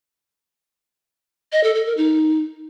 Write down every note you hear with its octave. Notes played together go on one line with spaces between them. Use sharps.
D#5
A4
A4
A#4
D#4